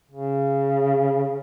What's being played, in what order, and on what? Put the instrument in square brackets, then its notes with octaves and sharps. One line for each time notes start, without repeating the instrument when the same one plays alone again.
[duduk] C#3